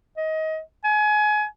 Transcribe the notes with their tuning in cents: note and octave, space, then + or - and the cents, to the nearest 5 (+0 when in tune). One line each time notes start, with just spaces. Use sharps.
D#5 +25
G#5 +25